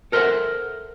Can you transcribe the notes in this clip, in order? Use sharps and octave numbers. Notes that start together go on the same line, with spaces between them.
A4 A#4 C5 D#5 E5 F#5